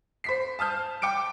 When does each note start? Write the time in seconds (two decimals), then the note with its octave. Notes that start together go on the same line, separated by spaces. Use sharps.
0.24 C5 B6 C7
0.59 A5 D#6 F6 G6
1.02 G5 D6 C#7 D7